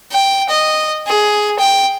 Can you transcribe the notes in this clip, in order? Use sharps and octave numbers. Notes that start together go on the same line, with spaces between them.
G5
D#5
G#4
G5